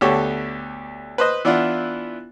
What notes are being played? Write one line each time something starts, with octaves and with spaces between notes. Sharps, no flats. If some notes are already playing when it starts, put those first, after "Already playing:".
D2 B3 G4 A4 C#5
B4 C5 D#5
E3 B3 D4 E4 F4